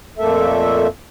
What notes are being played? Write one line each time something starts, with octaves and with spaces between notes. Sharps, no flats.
F2 A#2 A3 A#3 A4 E5